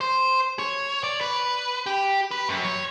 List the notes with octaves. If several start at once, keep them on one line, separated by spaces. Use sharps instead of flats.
C5
C#5
D5
B4
G4
B4
F#2
C#5